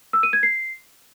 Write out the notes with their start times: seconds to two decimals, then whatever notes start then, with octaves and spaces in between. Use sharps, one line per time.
0.13 E6
0.23 D#7
0.33 G#6
0.43 C7